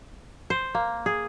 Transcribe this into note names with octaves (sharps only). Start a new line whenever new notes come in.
C5
A#3
G#4